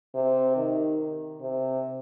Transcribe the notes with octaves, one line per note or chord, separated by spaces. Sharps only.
C3
D#3
C3